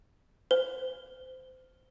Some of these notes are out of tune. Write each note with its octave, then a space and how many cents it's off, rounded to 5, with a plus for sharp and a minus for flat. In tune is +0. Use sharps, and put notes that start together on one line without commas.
C5 -20